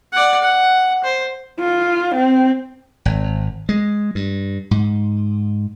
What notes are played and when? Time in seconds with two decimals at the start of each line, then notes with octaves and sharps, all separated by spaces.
0.12 D5 F#5
0.43 F#5
1.04 C5
1.60 F4
2.16 C4
3.05 G#1
3.69 G#3
4.15 G2
4.71 G#2